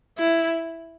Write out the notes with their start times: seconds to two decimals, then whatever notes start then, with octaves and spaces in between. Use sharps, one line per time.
0.18 E4